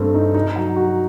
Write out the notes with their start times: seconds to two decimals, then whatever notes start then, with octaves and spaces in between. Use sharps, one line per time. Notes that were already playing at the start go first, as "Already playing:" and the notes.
Already playing: G2 A3 C4
0.14 D#4
0.34 D#4
0.56 F#3
0.76 F#4